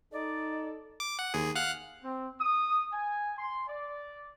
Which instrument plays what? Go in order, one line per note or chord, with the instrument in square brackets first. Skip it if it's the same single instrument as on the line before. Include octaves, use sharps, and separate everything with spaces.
[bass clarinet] D#4 [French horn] A4 [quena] D5 [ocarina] D#5
[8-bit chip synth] D6
F#5
D#2 G#4
F5 F#5 F#6
[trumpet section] C4
D#6
G#5
C6
D5